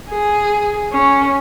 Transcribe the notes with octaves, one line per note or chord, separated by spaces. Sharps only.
G#4
C#4